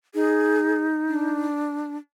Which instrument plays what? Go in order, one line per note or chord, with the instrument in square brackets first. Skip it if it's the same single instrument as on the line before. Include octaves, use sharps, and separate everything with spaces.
[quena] D#4 [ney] G#4
[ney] D4